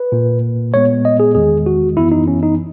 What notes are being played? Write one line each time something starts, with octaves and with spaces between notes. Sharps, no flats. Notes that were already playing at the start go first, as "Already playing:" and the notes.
Already playing: B4
A#2 A#3
A#2 G#3 B3 C#5
D#5
G#4
E2 D#3 G#3 G#4
F#4
F#2 E3 B3 E4
D#4
C#4
D#4